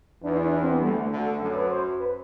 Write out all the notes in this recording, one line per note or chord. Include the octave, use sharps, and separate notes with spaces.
E2 E3 D4
E4
E4
D4
C4
B3
D2 D3 G3
A3
A3
D2 D3
A4
F#2 F#3 A4
B4
C5
B4